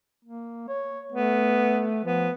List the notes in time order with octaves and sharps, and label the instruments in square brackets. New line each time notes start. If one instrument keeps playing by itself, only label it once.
[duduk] A#3
C#5
[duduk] A3 [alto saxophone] B3
[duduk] F3 [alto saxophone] B3